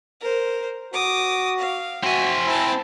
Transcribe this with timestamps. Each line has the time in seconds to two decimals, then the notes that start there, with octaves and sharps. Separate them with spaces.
0.21 A#4 C5
0.93 F#4 D6 D#6
1.59 F5
2.04 C4 F#4 E5 G#5
2.46 E4 C5 A5